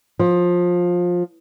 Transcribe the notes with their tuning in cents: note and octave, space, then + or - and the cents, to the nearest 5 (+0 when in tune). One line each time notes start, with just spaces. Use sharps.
F3 +20